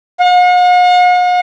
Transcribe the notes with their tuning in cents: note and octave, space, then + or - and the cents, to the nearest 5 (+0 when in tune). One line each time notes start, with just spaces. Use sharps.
F#5 -45